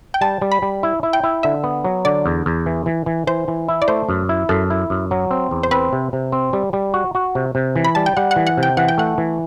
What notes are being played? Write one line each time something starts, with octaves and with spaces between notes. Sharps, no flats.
G5
G3 A5
G3
B5
G3
E4
E4
G5
E4
D3 E5
B3
F#3
D3 D5
E2
E2
E3
E3
E3
E3 C5
E3
E4
D5
A3 C5
F#2
E4
F#2 A4
E4
F#2
F#3
C4
E2
C5
C4 B4
C3
C3
C4
G3
G3
F#4
F#4
C3
C3
E3
B5
G3 A5
G5
G3 F#5
F#5
E3
F#5
C3
G5
E3 F#5
G5
A3 F#5
E3